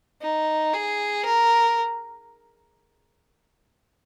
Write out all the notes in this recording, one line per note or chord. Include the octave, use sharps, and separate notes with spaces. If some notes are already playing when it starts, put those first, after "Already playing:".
D#4
G#4
A#4